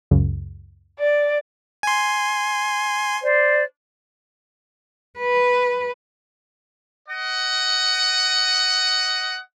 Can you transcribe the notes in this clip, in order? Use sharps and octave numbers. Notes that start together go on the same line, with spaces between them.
C#2 F#2 C#3
D5
G#5 C6
C5 D5
B4
D#5 F#5